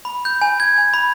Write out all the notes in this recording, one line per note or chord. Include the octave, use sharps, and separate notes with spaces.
B5
G6
G#5
G#6
G#5
B5